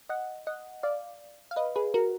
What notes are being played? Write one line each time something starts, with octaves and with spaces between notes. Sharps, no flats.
D#5 F#5
D#5 F#5
D5 F5
F5
B4 D#5
G#4 B4
F#4 A#4